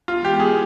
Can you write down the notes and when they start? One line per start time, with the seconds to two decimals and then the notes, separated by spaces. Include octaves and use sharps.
0.08 E3 G#3 B3 F4
0.25 G4
0.40 G#4